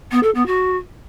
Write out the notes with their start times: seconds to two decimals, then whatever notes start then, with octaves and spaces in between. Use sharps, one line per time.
0.11 B3
0.23 A4
0.34 B3
0.46 F#4